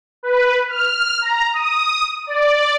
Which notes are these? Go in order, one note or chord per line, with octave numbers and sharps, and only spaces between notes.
B4
F6
A#5
D#6
D5